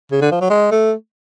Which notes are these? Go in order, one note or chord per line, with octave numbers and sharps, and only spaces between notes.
C#3
D3
F3
F#3
G#3
A3